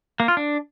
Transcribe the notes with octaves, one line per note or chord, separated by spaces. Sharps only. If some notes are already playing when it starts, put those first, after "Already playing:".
A#3
F4
D4